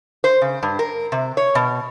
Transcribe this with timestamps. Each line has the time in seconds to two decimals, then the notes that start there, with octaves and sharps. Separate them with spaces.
0.24 C5
0.41 C#3
0.63 G2
0.79 A#4
1.12 C3
1.37 C#5
1.55 B2